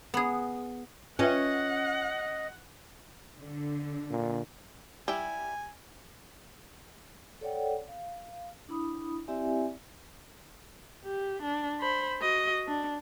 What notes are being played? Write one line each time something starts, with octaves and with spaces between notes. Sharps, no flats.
B3 G#4
C#4 F4 B4 D#5 E5 F#5
D3
A#2
G3 E4 G4 G#5
A4 C#5 D5 F#5 G5
F5
D4 E4 B5 D#6
C4 E4 G4 D5 E5 G#5
G4
D4
C5 B5
F#4 D#5
D4